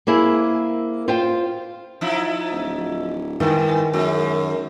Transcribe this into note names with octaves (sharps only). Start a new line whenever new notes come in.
A#3 C4 E4 G#4
F4 C5 F5 G5
F3 D#4 E4
D1
G2 D#3 E3
F#2 G#3